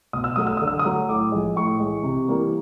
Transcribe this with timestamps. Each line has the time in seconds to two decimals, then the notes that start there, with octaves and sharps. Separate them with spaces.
0.13 B2 D#6
0.24 E6
0.36 F#3 A3 D#6
0.47 E6
0.57 D3 D#6
0.67 E6
0.79 D#6
0.85 F#3 A3
1.09 A2 D6
1.32 F3 G#3
1.56 A2 C#6
1.80 E3 G#3
2.03 C3
2.28 E3 G3 A#3